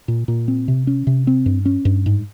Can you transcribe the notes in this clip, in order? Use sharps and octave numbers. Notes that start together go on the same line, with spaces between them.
A#2
A#2
C4
C3
C#4
C3
C4
G2
C#4
G2
G#2